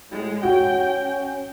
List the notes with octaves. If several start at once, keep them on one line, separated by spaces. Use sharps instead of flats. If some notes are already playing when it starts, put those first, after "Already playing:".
A2 G#3
C#4 F#4 G5